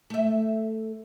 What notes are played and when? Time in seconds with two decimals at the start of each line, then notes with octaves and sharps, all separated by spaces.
0.10 A3 E5